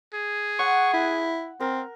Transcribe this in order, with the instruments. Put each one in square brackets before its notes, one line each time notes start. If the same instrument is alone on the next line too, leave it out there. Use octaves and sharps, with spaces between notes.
[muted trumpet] G#4
[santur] F#5 [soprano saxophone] C#6
[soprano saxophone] E4
[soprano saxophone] C4 [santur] A#4